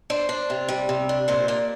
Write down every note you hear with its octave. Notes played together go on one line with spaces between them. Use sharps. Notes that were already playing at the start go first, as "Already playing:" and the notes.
D4 C5
D4
C3
G3
C3
D4
A#2 C5
A#3 D5